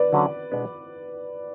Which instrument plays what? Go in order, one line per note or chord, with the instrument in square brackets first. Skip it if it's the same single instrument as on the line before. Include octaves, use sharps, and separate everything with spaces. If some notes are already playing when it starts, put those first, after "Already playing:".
Already playing: [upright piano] B4 D5
[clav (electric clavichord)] D3 F#3 C#4
B2 G#3 B3 D4 F#4